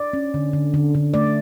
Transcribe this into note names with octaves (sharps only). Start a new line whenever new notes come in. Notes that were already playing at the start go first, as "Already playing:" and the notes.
Already playing: D5
C#4
D3
D3
D3
D3
A3 D5